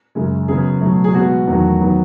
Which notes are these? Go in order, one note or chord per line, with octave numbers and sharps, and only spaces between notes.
F#2 C#3 G#3
C#3 F#3 B3 G#4
B2 F#3 A3
G#4
B2 G#3 B3 F#4
E2 D#3 F#3 A3
D#3 F#3 B3